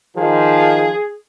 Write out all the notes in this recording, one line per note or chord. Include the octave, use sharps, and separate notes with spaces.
D#3 F3 G#4